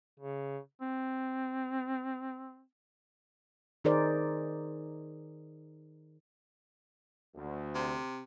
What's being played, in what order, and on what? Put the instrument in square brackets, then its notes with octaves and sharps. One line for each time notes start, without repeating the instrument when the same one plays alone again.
[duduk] C#3
C4
[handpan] D#3 D#4 G#4 A#4 C5 D5
[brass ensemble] D2
[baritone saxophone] C3